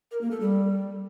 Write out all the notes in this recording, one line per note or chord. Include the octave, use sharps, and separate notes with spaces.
A#4
A#3
A4
G3